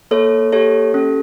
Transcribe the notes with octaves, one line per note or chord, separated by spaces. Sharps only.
A#3 A4 C#5
G4 A4 C#5
C#4 A4